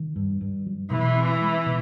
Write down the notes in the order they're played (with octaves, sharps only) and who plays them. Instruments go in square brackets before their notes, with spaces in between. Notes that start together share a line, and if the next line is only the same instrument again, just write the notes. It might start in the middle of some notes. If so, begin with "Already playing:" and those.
Already playing: [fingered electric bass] D#3
G2
G2
F#3
[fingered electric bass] B2 [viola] E3
[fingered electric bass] C4
G#3
B2